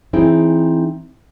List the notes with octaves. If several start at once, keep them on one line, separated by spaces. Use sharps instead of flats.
E3 C4 D#4 E4 G#4 G5